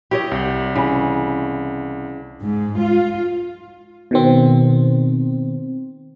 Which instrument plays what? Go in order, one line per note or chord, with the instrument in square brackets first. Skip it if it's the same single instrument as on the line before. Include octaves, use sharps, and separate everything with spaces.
[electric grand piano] E4 [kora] G4 C#5 D#5
[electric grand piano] C2
[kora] C#3 E3
[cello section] G#2
F4
[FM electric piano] B2 D#3 C4